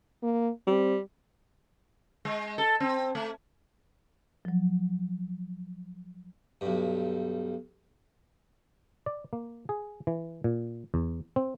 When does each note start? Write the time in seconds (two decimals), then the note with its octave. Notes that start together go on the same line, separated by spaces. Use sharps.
0.23 A#3
0.67 G3 C4
2.25 G#3
2.58 A4
2.80 C4
3.15 A3
4.45 F3 F#3
6.61 B1 G2
9.06 D5
9.33 A#3
9.69 G#4
10.07 E3
10.44 A#2
10.94 E2
11.36 C4